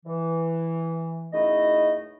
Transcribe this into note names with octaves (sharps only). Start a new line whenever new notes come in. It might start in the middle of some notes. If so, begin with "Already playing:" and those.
E3
C#2 F#2 A3 D#4 E4 D#5